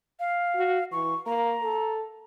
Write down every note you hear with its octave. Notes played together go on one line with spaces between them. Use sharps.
F5
F#4
E3 C#6
A#3 A#5
A4